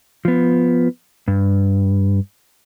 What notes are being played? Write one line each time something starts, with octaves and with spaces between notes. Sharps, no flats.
F3 B3
G2